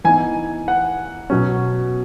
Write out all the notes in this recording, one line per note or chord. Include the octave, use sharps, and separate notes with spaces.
E3 B3 D#4 G#5
F#5
B2 F#3 C#4